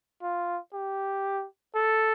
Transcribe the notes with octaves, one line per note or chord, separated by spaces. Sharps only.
F4
G4
A4